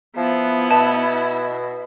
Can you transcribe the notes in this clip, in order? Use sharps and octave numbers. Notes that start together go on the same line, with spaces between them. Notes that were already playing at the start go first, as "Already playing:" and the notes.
F3 B3 E4
B2 A5